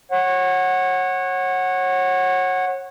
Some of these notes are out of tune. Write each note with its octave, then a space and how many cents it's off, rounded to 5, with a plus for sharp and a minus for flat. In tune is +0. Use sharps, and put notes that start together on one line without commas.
C#5 -25 F#5 +0